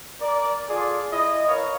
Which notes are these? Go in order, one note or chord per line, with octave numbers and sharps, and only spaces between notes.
A#4 D5
F4 G#4 A4 D5
E4 D#5
A#4 B4 C#5 F5